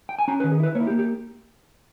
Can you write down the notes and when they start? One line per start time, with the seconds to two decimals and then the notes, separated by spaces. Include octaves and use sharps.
0.09 G5
0.19 G#5
0.28 C#4 A#5
0.40 B4
0.44 D#3
0.52 G#4
0.60 E4 B4
0.75 A#3 C#5
0.80 E4
0.87 G4
0.90 A#3
0.99 G4